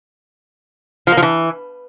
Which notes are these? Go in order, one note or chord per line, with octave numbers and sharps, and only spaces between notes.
F3
A#3
F3
E3